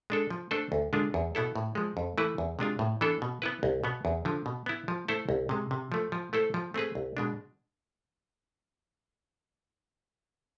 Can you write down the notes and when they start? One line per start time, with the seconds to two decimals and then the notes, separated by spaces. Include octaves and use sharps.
0.10 G#3 D4 A4
0.30 F3
0.51 A3 D4 A4 C5
0.72 D2
0.93 D3 G#3 D4 F4
1.14 E2
1.35 B2 B3 E4 A4
1.56 A2
1.75 F3 G#3
1.97 F2
2.18 E3 A3 E4 B4
2.38 E2
2.59 C3 G#3 D4 F4
2.79 A2
3.01 E3 B3 D4 A4
3.22 B2
3.42 B3 E4 B4
3.63 C2
3.84 B2 B3
4.05 E2
4.25 D3 F3
4.46 B2
4.66 B3 E4
4.88 F3
5.08 A3 E4 A4 C5
5.29 C2
5.49 C3 G#3
5.71 C3
5.92 F3 A3
6.12 F3
6.33 A3 E4 A4 C5
6.54 F3
6.74 A3 C4 G#4 B4
6.95 C2
7.17 B2 G#3 D4